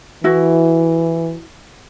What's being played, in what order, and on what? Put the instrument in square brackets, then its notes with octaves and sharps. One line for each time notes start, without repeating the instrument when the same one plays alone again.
[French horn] E3 [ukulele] E4 F#4